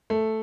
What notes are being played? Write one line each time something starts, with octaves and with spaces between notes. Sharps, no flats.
A3